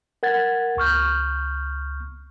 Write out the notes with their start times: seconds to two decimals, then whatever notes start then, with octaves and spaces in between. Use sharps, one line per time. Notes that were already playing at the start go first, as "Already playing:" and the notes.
0.23 A#4 F#5 G#6 A6
0.77 C#2 C#6 F6 G6